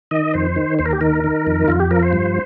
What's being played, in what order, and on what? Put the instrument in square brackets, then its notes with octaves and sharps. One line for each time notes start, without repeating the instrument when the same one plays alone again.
[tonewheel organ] D#3 D#5
F2 C5
D#3
D#2 C5
A#4
G4
D#3 A#4
D#3
F2
F2 F4
G4
F3 A#4
C5
G2